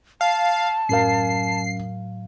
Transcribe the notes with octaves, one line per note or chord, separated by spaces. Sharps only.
F5 A5
F#2 A2 F#3 A#4 F5 C7